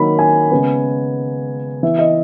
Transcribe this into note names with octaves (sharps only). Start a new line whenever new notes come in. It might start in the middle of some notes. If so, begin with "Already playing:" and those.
Already playing: D#3 F#3 A#3 B5
G#5
C#3 G#3 B3
E3 B3 E5
D#5